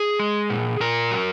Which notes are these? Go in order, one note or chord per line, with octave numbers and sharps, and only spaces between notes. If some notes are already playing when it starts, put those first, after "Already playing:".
Already playing: G#4
G#3
A#2
A#2 A#4
F#3